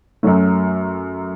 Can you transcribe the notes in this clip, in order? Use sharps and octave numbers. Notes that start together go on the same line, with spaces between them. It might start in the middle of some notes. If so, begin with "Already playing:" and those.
F#2 F#3 A3